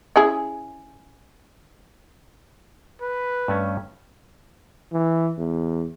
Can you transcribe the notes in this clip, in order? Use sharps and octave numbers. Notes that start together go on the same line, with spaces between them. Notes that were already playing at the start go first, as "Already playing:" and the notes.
C#4 E4 G#4
B4
G2 A3 C#4
E3
E2